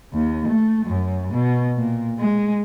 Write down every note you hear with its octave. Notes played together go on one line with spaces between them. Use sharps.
D#2
A3
F#2
B2
A#2
G#3